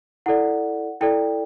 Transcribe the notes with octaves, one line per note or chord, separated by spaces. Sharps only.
E4 A4 D5 F#5
E4 A4 D5 G5